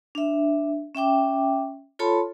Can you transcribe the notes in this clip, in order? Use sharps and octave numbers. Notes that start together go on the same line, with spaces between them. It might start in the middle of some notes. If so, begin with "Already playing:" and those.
D4 E5
C#4 E5 G5 D6
F4 A4 C#5 A5 B5 C6